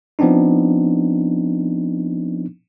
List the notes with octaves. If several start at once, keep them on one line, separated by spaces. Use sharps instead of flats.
F3 B3 C4 D4 D#4